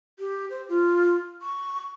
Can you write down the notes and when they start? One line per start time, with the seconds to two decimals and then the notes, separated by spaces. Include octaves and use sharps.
0.19 G4
0.50 C5
0.69 F4
1.42 C#6